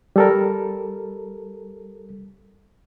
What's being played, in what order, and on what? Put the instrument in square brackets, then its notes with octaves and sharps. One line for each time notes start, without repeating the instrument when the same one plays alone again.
[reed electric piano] G3 A4 A#4